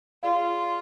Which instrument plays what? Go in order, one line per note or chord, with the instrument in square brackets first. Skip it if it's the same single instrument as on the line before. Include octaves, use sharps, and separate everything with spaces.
[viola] F4 [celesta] G#4 D5 F5